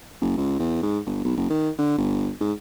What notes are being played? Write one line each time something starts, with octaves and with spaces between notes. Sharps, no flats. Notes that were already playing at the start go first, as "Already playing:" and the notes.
F#1
C#2
E2
G#2
G1
B1
F#1
D#3
D3
G1
G#2